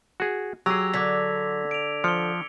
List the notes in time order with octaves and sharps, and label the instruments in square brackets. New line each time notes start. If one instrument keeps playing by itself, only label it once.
[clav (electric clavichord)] F#4 G#4
[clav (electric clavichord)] F#3 G#4 [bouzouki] G4 [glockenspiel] E6 A#6 F7
[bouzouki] D3 [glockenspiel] D6 G#6 B6
[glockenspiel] D7 F7
[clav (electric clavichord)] F3 [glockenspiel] C#7 G7